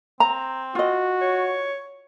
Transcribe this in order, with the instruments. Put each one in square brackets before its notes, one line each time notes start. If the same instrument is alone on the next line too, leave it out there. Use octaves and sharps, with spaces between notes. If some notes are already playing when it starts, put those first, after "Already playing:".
[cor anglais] C4 [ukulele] A#5
[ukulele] F4 D#5 [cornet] F#4
[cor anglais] C#5